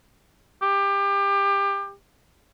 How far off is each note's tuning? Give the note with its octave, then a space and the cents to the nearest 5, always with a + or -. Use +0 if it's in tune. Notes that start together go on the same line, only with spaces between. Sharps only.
G4 +25